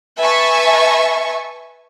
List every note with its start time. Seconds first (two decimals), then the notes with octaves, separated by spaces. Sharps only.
0.18 B4 E5 G#5 A5 C#6